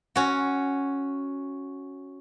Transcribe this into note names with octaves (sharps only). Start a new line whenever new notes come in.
C#4 F#4